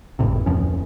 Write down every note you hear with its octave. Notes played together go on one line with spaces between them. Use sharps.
G#1 F2 A2 C3
D1 F2 F3 C#4